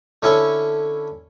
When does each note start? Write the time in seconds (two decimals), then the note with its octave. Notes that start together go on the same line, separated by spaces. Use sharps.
0.22 D3 C#4 E4 A4 C#5